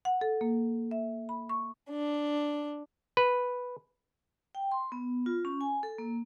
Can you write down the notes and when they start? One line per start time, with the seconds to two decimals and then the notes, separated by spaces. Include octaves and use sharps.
0.05 F#5
0.21 A4
0.41 A#3
0.91 E5
1.29 B5
1.49 C#6
1.90 D4
3.17 B4
4.55 G5
4.72 C6
4.92 B3
5.26 F4
5.45 C#4
5.61 G#5
5.83 A4
5.98 A#3